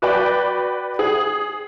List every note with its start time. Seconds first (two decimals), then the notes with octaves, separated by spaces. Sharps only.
0.02 F#4 B4 D5 G5
0.99 G#4